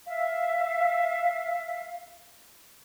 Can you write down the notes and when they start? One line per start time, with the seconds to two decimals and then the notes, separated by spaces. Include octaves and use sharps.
0.06 E5 F5